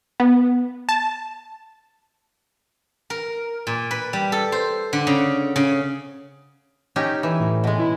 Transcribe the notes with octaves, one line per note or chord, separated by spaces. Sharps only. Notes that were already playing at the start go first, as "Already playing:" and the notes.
B3
A5
A#4
A#2
B4
G3
A4
C5
D3
C#3
C#3
C#4 D#4 G4
E3
A2
B2 G#3
E4